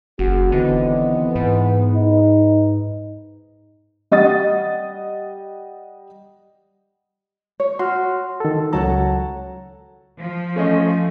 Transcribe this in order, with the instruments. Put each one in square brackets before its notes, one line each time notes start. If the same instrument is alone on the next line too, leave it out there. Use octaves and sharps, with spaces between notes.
[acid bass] F#1 [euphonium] F#4 [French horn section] G#4
[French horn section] D#2 C4 D#5 [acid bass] D3 [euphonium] E3 [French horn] B3
[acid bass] G#2 [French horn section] B4
[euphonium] D#4
[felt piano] G3 D#5 F#5 D#6 A6
[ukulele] C#5
[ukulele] F#4 [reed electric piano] C6 F6
[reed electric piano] D#3 A4
[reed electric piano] C#2 F#3 A#5 [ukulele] A4 C#5 F#5
[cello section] F3
[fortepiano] A3 C#4 D#5